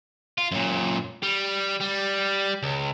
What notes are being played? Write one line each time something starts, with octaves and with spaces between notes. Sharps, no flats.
F4
F#2 A#2
G3
G3
C#2